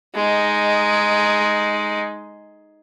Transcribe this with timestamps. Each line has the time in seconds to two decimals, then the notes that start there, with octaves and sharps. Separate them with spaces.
0.15 G#3 D#4